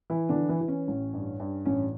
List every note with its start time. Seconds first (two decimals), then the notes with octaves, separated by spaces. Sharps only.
0.10 E3 E4
0.29 D3 D4
0.36 E3
0.49 E3 E4
0.61 E3
0.68 C#4
0.88 A1
1.14 G2
1.40 G2
1.66 A1 C#4